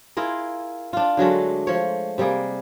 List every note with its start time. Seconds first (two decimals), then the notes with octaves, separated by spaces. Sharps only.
0.17 E4 F4 G#4 A#4
0.93 D4 F4
1.17 D3 F#3 G#3 A3
1.67 F3 C#5
2.18 C3 G3 A#3 G#4